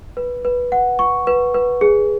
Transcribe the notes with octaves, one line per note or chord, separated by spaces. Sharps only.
B4
B4
F#5
C#6
B4
B4
G#4